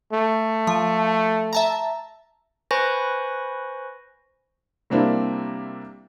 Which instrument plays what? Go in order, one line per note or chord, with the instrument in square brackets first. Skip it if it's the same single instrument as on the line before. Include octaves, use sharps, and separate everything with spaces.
[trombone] A3
[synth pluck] F3
E5 A5 A#5
[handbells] B4 C5 G#5 B5 C#6 A#6
[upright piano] C3 G3 A#3 C4 D4 E4